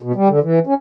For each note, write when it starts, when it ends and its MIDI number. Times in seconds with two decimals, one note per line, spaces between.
0.02 0.12 47
0.15 0.28 55
0.29 0.40 50
0.43 0.59 52
0.67 0.74 61